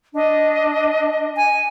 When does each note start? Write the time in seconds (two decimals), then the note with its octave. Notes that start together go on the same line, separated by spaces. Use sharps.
0.13 D4 D#5
1.36 G#5